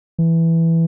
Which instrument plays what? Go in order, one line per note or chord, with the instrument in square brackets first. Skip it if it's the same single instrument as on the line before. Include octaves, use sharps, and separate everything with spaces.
[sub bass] E3